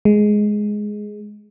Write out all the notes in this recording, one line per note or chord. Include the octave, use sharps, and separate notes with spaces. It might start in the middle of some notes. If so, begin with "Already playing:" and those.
G#3